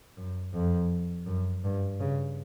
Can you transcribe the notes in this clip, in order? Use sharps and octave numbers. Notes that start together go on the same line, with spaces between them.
F#2
F2
F#2
G2
C#3